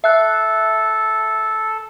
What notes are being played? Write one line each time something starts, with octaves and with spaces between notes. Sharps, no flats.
A4 E5 F#6